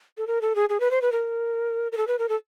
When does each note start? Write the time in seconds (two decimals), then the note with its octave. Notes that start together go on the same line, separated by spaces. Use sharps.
0.17 A4
0.27 A#4
0.41 A4
0.56 G#4
0.69 G#4
0.80 B4
0.91 C5
1.02 B4
1.12 A#4
1.92 A#4
1.97 A4
2.07 B4
2.19 A#4
2.29 A4